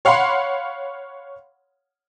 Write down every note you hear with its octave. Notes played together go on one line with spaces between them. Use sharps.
C#5 F5 F#5 B5 C6